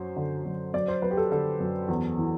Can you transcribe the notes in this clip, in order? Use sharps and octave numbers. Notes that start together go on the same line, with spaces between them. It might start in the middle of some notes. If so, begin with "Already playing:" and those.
Already playing: F#2 F#3 C5
D3
F#2
F#2 D5
C5
F#3 B4
G4
A4
D3 A4
F#2
E2
E3